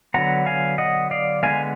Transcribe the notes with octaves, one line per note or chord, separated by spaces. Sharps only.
D3 F#3 B3 F#5 A#5
F5 G#5
D#5 F#5
D5 F5
D3 G#3 B3 F5 G#5